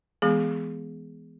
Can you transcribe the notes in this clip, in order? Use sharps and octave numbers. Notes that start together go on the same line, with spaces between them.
E3 G#3 B3 G#4